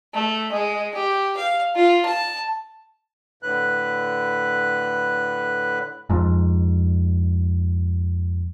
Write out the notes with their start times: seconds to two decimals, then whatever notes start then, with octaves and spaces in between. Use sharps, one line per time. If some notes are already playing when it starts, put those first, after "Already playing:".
0.14 A3
0.51 G#3
0.94 G4
1.37 F5
1.76 F4
2.05 A5
3.43 A2 D3 B4 F#6
6.10 F2 G#2